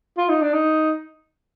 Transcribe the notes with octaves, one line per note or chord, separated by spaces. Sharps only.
F4
D#4
D4
D#4